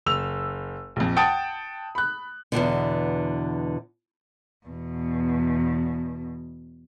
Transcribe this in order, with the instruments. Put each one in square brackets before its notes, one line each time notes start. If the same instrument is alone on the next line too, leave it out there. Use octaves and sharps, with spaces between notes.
[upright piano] F#1 E6 F7
A#1 F2
F#5 G5 A5 D#6 A6 D7
B5 F#6
[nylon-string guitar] E2 G#2 B2 D3
[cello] E2 B2